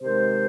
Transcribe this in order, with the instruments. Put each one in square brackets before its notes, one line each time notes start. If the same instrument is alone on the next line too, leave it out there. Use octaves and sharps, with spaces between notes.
[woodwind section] C3 D#3 G#3 C5